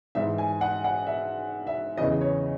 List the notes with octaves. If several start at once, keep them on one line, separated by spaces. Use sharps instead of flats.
G#2 E3 E5
G#5
F#5
F#5
E5
E5
E2 C#3 E3 D#5
C#5